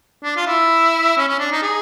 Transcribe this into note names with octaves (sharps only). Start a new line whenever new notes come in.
D4
F4
E4
C#4
C#4
D4
D#4
G#4